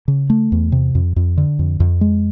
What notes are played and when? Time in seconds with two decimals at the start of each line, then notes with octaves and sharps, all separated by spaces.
0.08 C#3
0.30 A3
0.52 E2
0.72 C3
0.95 F2
1.16 F2
1.37 D3
1.59 F2
1.80 F2
2.01 G#3